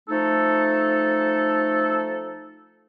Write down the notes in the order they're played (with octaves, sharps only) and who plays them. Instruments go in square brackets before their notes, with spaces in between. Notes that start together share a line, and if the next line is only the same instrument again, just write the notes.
[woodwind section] F3 A3 D#4 A4